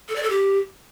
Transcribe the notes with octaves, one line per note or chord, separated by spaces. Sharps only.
A4
D5
A4
G4